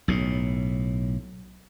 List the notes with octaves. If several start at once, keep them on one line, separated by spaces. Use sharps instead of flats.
B1 A2